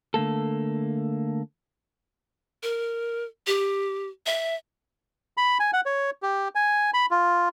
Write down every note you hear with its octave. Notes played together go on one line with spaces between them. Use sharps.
D3 A3 A#3 A4
A#4
G4
E5
B5
G#5
F#5
C#5
G4
G#5
B5
F4